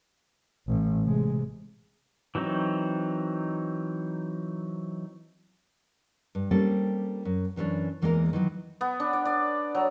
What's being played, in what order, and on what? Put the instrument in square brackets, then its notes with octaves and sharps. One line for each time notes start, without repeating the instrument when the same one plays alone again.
[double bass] A1
C3 G#3
[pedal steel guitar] E3 F#3 C4 D#4
[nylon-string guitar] G2
G3 A#3 C4 C#4 A4
F#2
F#2 E3 A3 C#4 D4
E2 E3 G#3 A#3 G#4 A#4
D#3 E3 F#3
[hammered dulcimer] B3
D4
D5
D5
F#3